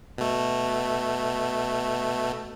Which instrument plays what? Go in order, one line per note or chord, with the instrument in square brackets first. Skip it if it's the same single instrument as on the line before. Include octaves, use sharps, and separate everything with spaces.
[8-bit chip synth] B2 A3